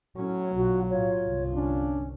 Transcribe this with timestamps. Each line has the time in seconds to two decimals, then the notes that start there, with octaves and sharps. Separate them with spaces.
0.17 A2 F#3 C#4
0.56 B1 D3 F4 F#4
0.90 A2 F4 C#5
1.25 G1 C2
1.54 C#4 D4